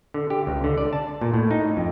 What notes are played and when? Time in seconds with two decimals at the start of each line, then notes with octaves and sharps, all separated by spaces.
0.14 D3
0.30 G4
0.47 C#2
0.64 D3
0.78 D5
0.93 A5
1.21 A#2
1.34 A2
1.51 D#4
1.77 F2